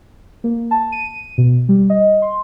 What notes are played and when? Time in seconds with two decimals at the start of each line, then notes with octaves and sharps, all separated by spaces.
0.44 A#3
0.71 A5
0.92 D#7
1.38 B2
1.69 G3
1.90 D#5
2.22 C6